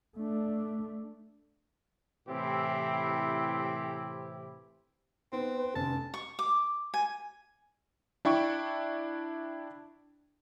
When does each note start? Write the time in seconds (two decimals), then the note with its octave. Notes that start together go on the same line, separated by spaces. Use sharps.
0.17 A3 D4
2.28 A2 C3 E3 C4 E4 G4
5.33 B3 C4 D#4 B4
5.75 F1 C#4 A5
6.14 C#6
6.39 D6
6.94 G#5
8.25 D4 E4 G5 C#6